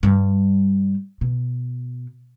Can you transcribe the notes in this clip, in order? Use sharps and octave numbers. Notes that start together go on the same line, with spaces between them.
G2 G3
B2